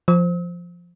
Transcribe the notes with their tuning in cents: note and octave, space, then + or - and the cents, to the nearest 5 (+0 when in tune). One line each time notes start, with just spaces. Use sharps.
F3 +0 C5 +0 E6 -45